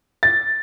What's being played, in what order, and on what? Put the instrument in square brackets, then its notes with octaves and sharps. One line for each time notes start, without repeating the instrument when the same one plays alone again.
[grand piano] A6